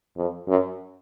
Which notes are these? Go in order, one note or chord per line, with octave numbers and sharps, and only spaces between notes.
F2
F#2